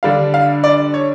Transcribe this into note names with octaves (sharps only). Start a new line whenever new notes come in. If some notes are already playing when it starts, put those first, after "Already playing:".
D3 G3 D4 F5
F5
D5
C#5